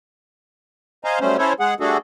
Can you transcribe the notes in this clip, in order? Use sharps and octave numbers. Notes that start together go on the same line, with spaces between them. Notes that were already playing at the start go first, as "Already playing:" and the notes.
C5 D#5 F5 G#5 A#5
F#3 G3 A3 C#4 C5
C#4 E4 A4 C5 C#5
G#3 G#4 F#5
G3 A3 D4 F#4 G#4 A4